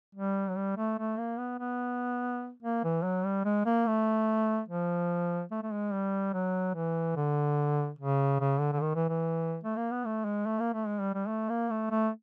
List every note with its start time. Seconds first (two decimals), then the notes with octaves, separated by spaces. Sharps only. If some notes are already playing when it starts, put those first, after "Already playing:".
0.15 G3
0.49 F#3
0.57 G3
0.77 A3
0.98 A3
1.18 A#3
1.39 B3
1.59 B3
2.63 A#3
2.84 E3
3.04 F#3
3.25 G3
3.45 G#3
3.66 A#3
3.86 A3
4.68 F3
5.51 A3
5.63 A3
5.72 G#3
5.93 G3
6.33 F#3
6.75 E3
7.16 D3
7.99 C#3
8.40 C#3
8.60 D3
8.72 D3
8.81 D#3
8.95 E3
9.09 E3
9.64 A3
9.77 A#3
9.91 B3
10.05 A3
10.25 G#3
10.46 A3
10.60 A#3
10.74 A3
10.87 G#3
11.00 G3
11.14 G3
11.28 A3
11.49 A#3
11.70 A3
11.91 A3